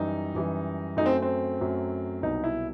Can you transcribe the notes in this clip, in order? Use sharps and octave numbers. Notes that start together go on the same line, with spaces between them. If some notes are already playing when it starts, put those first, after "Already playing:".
Already playing: F#2 E3 G3 D#4
F#2 E3 G3
F#2 F#3 A3 D#4
C4
C4
F#2 F#3 A3
C2 B2 F#3 D#4
E4